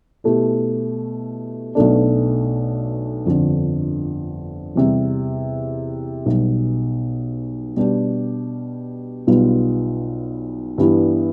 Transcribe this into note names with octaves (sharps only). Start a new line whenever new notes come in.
B2 A3 E4 G4
B1 B2 A3 D4
G1 F2 D3
E2 C3 G3
B1 B2 G3
B2 G3 D4 G4
B1 B2 G3 B3 F4
G2 E3 G3 B3 E4